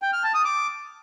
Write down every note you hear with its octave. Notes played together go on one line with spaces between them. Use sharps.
G5
F6
A5
D#6
D6